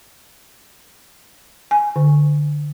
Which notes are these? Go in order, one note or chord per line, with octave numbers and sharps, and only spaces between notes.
G#5
D3